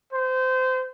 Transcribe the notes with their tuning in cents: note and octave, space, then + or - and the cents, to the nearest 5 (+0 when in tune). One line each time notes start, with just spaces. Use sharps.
C5 -25